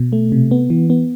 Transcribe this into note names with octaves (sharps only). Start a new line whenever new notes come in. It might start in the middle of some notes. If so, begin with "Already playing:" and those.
Already playing: B2
A3
C3
B3
E3
B3